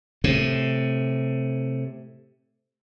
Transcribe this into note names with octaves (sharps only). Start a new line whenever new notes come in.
A2 C3